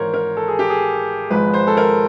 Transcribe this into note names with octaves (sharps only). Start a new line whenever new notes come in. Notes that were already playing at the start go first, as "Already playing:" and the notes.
Already playing: G#1 G#2 E3 A#4 C5 C#5
A#4
A4
G#4
G4
G#4
G#1 G#2 F3 G#3 B4
C5
A4
A#4